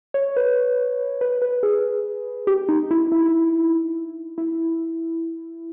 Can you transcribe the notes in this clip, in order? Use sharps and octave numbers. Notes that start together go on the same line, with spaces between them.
C#5
B4
B4
B4
G#4
G4
D#4
E4
E4
E4